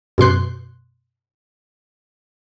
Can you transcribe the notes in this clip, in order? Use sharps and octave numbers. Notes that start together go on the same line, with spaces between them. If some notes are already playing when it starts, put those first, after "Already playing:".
F#2 B2 C6 F#6